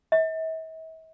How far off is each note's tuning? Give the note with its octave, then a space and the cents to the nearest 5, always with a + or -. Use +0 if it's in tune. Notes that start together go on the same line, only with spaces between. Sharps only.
E5 -45